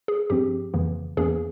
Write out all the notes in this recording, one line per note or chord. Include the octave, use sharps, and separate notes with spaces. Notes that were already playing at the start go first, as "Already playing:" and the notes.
G#4
G2 F3 C4 G4
F2 C#3 E3 A#3
E2 E3 A#3 C#4 G#4